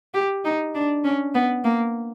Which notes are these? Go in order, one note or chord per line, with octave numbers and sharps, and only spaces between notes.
G4
D#4
D4
C#4
B3
A#3